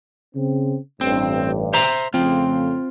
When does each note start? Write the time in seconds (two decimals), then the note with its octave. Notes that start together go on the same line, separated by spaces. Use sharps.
0.35 C#3 C4
1.01 A1 G2 C4
1.74 C5 E5 A#5
2.14 F2 C#3 A3 C4 F4